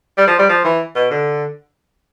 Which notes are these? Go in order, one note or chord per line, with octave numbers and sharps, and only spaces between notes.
G3
F3
G3
F3
E3
B2
D3